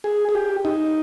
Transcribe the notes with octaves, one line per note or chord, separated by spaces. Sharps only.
G#4
G#4
G4
D#4